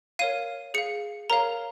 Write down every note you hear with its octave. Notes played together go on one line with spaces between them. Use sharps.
A#4 C#5 F5 D#7
G#4 F5 C#7
A#4 C#5 F5 A#5